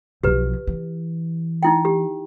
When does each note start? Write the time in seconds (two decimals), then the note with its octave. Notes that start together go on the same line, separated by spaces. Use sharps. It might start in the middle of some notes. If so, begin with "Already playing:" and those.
0.23 B1 F3 G4 B4
0.67 E3
1.63 D#4 E4 G5
1.85 G4